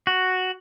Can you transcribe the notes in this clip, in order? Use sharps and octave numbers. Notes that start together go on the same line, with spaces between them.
F#4